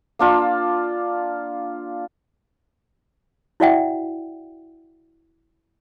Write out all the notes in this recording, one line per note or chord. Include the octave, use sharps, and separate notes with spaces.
A#3 D4 F4
E4 F#4 D5 E5 F#5 G5